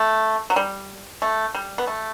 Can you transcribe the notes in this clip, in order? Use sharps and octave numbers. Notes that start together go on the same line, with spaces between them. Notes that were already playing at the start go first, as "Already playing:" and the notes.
Already playing: A3
F#3
G3
A3
G3
B3
A3